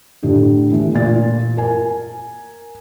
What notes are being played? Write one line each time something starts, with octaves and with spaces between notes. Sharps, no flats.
A2 D3 G4 A4
E3 A3
A#2 A6
A#4 G#5